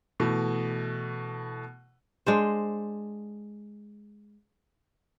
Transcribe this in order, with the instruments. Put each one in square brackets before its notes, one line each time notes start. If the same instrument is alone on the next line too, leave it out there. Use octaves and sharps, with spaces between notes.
[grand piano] B2 E3 A3
[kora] G#3 D4 C5